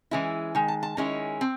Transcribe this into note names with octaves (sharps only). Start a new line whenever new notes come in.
E3 G#3 C#4 E4
D#3 G#3
A5
A5
D#3 G#3 C#4 E4
C4